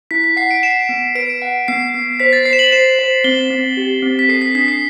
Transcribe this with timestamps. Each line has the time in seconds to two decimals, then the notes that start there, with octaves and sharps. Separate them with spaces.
0.11 E4 B6
0.24 B6
0.37 F#5 C7
0.51 D7
0.63 F#5 E7
0.89 B3
1.15 B4 D7
1.42 F#5
1.68 B3 C7
1.94 B3
2.20 C5 B6
2.33 A6
2.45 C5 C7
2.53 E7
2.59 F#7
2.72 C5 E7
2.99 C5
3.24 C4 G7
3.50 C4
3.77 G4
4.02 C4
4.19 B6
4.29 A4 C7
4.42 B6
4.55 D4 B6
4.68 C7